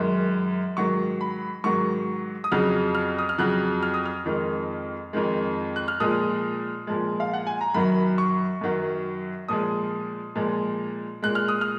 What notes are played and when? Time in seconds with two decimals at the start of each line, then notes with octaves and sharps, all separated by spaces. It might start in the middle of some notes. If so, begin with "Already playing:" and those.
Already playing: F#2 D#3 G#3
0.77 G#2 D#3 F#3 C#6
1.21 B5
1.64 G#2 D#3 F#3 C#6
2.44 D#6
2.52 F2 C#3 F#3 F6
2.95 F6
3.19 D#6
3.29 F6
3.38 F2 C#3 F#3 F#6
3.83 F6
3.94 D#6
4.06 F6
4.25 F2 D#3 G#3
5.13 F2 D#3 G#3
5.76 F#6
5.88 F6
6.00 A#2 F3 G#3 D#6
6.87 A#2 F3 G#3
7.20 F5
7.34 F#5
7.47 G#5
7.61 A#5
7.74 F#2 D#3 F#3 B5
8.18 C#6
8.61 F#2 D#3 F#3
9.48 A#2 F3 G#3 D#6
10.36 A#2 F3 G#3
11.22 A#2 G#3 F#6
11.35 F6
11.48 D#6
11.61 F6